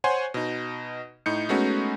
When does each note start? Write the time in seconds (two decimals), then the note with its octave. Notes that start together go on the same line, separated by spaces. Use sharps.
0.04 C5 C#5 F#5 G#5 C6
0.34 B2 D#4
1.26 A2 D#4 G6 C#7
1.49 G#3 A3 B3 C#4 D#4 F#4